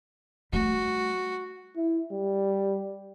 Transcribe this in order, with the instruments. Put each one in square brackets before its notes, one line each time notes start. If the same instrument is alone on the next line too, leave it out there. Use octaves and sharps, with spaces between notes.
[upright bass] G3 A3 [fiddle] F#4
[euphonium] E4
G3